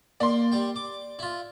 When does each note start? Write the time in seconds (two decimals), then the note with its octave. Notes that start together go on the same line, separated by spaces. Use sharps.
0.20 A#3 D5 C6
0.52 G3 G5
0.76 D6
1.19 E4 F4